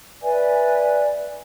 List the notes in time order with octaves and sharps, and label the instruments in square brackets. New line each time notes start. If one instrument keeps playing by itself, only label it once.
[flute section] B4 D5 E5 G#5